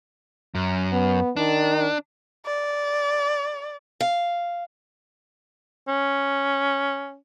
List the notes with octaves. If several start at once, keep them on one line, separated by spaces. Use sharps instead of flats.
F#2
B3
D#3 D4
D5
F5
C#4